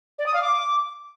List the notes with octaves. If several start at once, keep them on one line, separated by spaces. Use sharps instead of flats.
D5
D#6
F5
D6